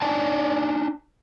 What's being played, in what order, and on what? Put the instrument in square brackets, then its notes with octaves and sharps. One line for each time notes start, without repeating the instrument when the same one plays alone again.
[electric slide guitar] D4 D#4 D5 G#5 A5